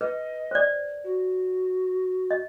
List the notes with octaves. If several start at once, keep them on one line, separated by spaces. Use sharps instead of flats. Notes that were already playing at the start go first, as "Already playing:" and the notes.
B4 D#5
C5 D5
F#4
D#5